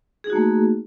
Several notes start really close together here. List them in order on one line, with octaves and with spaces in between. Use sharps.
G#4 D#4 F#4 A#3 A3